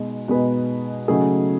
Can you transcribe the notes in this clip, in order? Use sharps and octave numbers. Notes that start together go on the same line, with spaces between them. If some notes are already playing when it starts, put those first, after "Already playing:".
Already playing: B2 G#3 D#4
B2 G#3 D#4 G#4 B4
C#3 F#3 A3 D#4 G#4